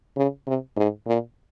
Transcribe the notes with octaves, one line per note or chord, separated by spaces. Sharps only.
C#3
C3
G#2
A#2